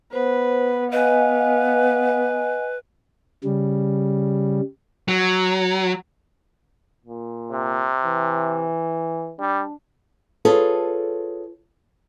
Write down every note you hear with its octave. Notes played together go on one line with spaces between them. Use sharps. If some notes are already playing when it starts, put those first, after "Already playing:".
B3 B4 C5
B4 D#5 F5 F#5 G#5
C#3 G3
F#3
A#2
C3
E3
G3 D4
F4 G#4 A4 B4 C#5